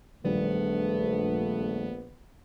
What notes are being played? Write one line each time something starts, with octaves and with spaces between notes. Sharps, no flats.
A#1 D#3 G3 A3 B3 D4